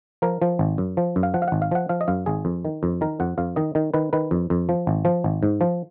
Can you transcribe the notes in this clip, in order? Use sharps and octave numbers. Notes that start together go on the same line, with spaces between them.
F3 A#4
F3
G#1
F#2
F3
F#2
F5
F3 F#5
F5
G#1 F#5
F5
F3 F#5
F3 F5
D#5
F#2 F5
G#1 G#4
F2
D#3
F2
D#3 A#4
F2 F#5
F2 F5
D#3 D#5
D#3
D#3 B4
D#3 B4
F2
F2
F3
G#1
F3
G#1
G#2
F3